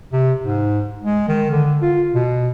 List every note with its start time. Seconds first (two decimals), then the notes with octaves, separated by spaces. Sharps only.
0.12 C3
0.41 G#2
1.02 G#3
1.28 D#3
1.51 D3
1.82 F4
2.15 B2